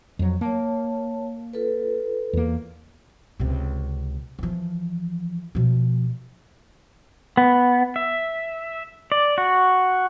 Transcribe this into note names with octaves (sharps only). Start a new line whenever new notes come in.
F2 F#3
A#3 C#5 A5
F4 A4 B4
E2 A#3
C#2 C3
E3 F3
B2 F3
B3
E5
D5
F#4